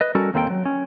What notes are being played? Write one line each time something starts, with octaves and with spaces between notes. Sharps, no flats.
B4 D#5
G3 C#4 F#4 A4 A#4
D#2 A#3 C4 A4 E5 G5
F#3
C#4